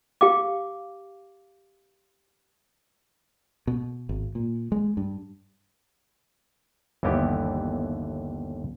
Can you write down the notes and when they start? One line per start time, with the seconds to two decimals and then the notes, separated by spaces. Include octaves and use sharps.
0.21 G4 F5 D6
3.67 B2
4.09 G#1
4.35 A#2
4.72 G#3
4.97 G2
7.03 G1 D#2 E3 B3 G4